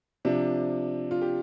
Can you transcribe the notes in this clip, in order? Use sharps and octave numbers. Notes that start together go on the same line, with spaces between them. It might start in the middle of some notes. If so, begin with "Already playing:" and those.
C3 F3 D4
F4
G4